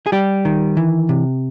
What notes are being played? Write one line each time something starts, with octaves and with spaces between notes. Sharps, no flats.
G#4
G3 G4
D#3
E3
C3